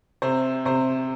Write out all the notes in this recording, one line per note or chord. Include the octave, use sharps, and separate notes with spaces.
C3 C5
C3 C5